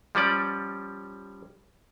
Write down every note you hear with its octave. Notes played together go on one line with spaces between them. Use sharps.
F3 G3 C#4 D5